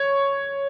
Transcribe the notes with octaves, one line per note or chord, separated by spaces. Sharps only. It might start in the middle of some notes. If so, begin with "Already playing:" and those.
Already playing: C#5